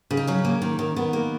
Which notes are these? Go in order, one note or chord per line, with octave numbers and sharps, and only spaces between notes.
C#3
D#4
F#3 C#4
A#3
D#3
D#3
D#3 B3
A#3